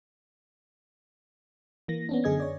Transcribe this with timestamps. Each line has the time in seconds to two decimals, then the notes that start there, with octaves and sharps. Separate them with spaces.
1.88 E3 A#3 A#6
2.09 B3 C#4 D4
2.24 F#2 D3 G#4 D#5 G#6
2.40 C#5 D5